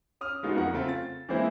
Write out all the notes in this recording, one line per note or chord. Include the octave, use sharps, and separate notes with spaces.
C#4 D#6 F6
G#3 A3 B3 D#4 F4 F#4
F2 A#4 F#5
C#3 A3 C4 F4
A6
E3 G#3 A#3 C4 E4 C5